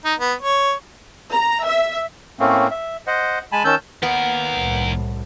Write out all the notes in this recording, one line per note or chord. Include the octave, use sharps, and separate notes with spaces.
D#4
B3
C#5
A#5
E5
A2 A3 A#3 C4 C#4
E5
C5 D#5 F#5
G#3 G#5 A5 B5
D#3 C#4 A5 E6 G6
D#2 B3 A#4
C2 A2